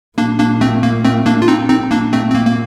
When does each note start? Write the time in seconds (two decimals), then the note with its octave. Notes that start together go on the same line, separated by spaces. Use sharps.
0.18 A#2 A#3 D4
0.39 A#3 D4
0.61 A3 C4
0.83 A#3
1.05 A3 C4
1.26 A#3 D4
1.42 F4
1.48 C4 D#4
1.70 C4 D#4
1.91 A#2 A#3 D4
2.13 A3 C4
2.30 C4
2.35 A#3
2.46 A#3